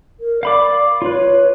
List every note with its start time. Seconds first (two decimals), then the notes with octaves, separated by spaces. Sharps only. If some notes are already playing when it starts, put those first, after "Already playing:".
0.20 A#4
0.43 D5 F5 B5 D6
1.02 F4 B4 C#5